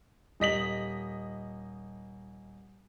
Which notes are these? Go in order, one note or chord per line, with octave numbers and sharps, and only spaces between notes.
D#1 D#5 B6 F#7